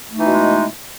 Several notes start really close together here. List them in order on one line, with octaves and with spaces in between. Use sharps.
A3 D#4 E3 B2 G#3